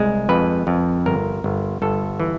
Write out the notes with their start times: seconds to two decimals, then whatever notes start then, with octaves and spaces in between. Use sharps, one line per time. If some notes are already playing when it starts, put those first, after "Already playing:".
Already playing: C2 G#3
0.29 F2 B4
0.67 F2
1.06 G1 A#4
1.44 G1
1.82 G1 A4
2.20 E3